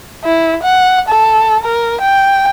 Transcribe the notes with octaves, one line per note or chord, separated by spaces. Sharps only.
E4
F#5
A4
A#4
G5